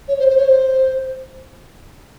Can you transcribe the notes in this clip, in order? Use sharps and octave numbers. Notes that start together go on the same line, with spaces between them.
C#5
C5
C5
C#5
C5